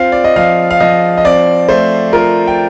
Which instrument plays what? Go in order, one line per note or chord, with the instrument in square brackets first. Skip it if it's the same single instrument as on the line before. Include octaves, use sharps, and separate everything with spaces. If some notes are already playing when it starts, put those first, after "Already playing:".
Already playing: [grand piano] C4 F4 F5
D5
D#5
F3 F5
F5
F3 D#5
D#5
C4 D5
A3 C5
F4 A#4
G5